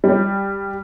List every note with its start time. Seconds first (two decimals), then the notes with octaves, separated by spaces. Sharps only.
0.04 G3